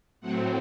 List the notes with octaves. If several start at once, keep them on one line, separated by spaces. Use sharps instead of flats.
A2 F#3 C4 F#5